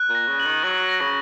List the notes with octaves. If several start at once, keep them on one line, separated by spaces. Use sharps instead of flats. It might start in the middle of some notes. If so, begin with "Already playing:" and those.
Already playing: F#6
A#2
A#6
C#3
F#7
D#3
F#3 F#7
A#6
C#3